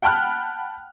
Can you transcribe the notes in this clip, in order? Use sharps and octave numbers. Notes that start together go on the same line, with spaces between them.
F#5 G5 A5 B5 F6 F#6